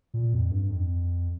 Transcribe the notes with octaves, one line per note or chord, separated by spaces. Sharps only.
A#2
F2
G2
F2